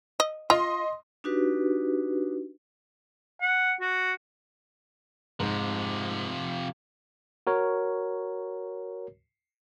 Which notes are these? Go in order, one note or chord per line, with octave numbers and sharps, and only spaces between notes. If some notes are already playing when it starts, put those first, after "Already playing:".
D#5
F4 D#5 C6
D4 D#4 F#4 G4 B4
F#5
F#4
G#2 C3 F3
F#4 A#4 C#5